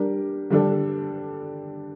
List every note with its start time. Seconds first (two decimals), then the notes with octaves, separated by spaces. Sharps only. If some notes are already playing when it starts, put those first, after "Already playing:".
Already playing: G3 D4 G4 A#4
0.50 D3 G3 D4 A4